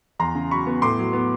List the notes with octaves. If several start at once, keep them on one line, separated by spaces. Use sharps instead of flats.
E2 A#5 C6
C#3
F#3 B5 C#6
B3
A2 C6 D6
F#3
B3